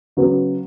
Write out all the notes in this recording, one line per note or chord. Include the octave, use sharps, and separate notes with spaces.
C#3 F#3 B3